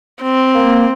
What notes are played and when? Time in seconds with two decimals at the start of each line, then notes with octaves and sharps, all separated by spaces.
0.23 C4
0.55 A#3